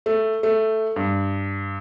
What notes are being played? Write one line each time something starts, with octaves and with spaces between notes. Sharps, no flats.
A3
A3
G2